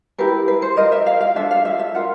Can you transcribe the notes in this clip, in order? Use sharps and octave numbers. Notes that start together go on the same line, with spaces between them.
E4 G4 A#4 B4
B4
C5
F4 A#4 D#5
E5
F5
F5
D4 F4 A4 E5
F5
E5
E5
F4 A#4 F#5